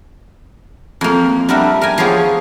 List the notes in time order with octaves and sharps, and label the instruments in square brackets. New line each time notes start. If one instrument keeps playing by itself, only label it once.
[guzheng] F2 A#3
G3 B3 D4 A#4 E5
A#4 G5 G#5
F3 B3 G4 G#4 C#5